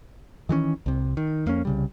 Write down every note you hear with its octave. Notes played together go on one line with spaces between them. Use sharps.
D#3 E3 G#3 C#4
C2 C3
D#3
F2 A#3 C4 C#4
C2 C#3 G3